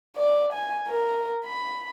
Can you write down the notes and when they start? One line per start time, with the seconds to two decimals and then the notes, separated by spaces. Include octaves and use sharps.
0.16 D5
0.53 G#5
0.88 A#4
1.45 B5